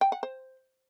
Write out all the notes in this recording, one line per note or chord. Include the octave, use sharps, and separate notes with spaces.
G5
F#5
C5